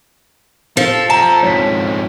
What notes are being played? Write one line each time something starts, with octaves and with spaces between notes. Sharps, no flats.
F3 A4
C4 A4 A5 A#5
F2 G#2 C#5 B6